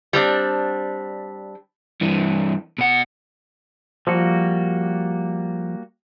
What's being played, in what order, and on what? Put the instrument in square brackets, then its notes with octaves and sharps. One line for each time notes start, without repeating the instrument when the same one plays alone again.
[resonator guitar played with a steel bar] G3 C4 D4
[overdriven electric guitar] G2 E3
B2 F#5
[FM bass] F3 [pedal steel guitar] G3 A#3 F#4